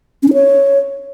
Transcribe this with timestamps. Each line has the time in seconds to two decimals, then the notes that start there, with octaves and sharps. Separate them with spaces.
0.23 C#4
0.28 D#4
0.33 C#5